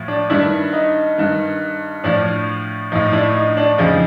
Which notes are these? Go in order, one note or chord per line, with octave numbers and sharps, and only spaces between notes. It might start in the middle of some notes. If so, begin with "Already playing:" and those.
Already playing: A2 F3
D4
G2 D#3 D4 E4
D#4
G2 D#3
A2 F3 D4
A2 F3 D#4
D4 E4
D#4
D4
F2 C#3 F3 D#4